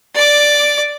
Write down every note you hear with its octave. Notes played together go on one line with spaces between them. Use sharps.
D5 D6